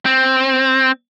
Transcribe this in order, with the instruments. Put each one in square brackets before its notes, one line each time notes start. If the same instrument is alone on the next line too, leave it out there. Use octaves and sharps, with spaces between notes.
[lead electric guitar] C4